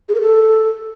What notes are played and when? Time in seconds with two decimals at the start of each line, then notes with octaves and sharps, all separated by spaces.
0.09 G#4
0.15 A#4
0.21 A4